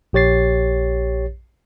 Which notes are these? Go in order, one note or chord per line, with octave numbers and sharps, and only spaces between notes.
A#1 G4 C#5 A6 C7